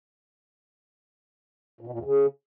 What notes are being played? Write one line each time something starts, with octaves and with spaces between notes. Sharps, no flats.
A#2
B2
A#2
E2
C#3